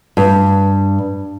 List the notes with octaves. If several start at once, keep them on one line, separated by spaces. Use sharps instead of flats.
G2